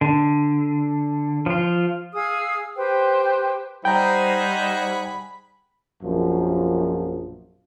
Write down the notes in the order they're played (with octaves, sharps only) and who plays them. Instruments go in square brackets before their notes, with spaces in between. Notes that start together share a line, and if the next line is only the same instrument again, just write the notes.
[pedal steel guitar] D3
F3 F4
[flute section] G#4 F5 D#6 E6
G4 B4 C5 G5
[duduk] G3 [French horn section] D#4 C5 [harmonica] G#4 F#5 B5 [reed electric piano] G5 A#5
[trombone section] A#1 F#2 B2 F3